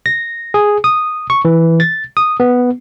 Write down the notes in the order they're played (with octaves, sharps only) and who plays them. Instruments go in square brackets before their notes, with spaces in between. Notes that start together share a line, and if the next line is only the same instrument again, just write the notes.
[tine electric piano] A#6
G#4
D#6
C#6
E3
A6
D#6
B3